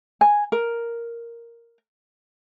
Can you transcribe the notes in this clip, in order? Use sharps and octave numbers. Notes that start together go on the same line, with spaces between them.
G#5
A#4